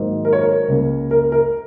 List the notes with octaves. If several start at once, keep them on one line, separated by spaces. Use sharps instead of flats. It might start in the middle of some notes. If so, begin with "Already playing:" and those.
Already playing: G#2 D#3 F#3 A#3
A#4
C#5
A#4
C#2 C#3 A#3
A#4
A#4